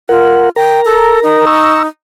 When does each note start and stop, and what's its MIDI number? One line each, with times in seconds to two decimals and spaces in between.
0.09 0.50 65
0.09 0.49 70
0.09 0.49 78
0.56 1.45 70
0.56 0.81 79
0.56 1.45 82
0.85 1.19 69
1.23 1.87 63
1.47 1.83 82
1.47 1.83 85
1.47 1.83 88